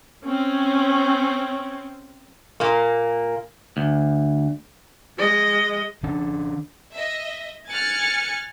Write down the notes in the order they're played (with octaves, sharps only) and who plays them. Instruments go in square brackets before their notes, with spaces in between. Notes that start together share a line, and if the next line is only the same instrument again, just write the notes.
[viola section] C4 C#4
[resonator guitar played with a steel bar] A#2 A#3
[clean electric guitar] D2
[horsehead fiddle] G#3 D#5
[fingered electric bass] D#3 C#4 D4
[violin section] D#5 E5
[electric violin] G#5 C#7 [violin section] F6 F#6 A6